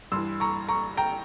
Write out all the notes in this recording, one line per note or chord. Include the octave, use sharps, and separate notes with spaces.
G2 E3 C6 E6
A#5 C#6
A#5 C#6
G5 A#5